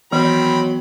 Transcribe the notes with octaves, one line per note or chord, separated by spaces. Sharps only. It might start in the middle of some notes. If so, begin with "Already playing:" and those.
D#3 E3 F#3 B3 C4 B5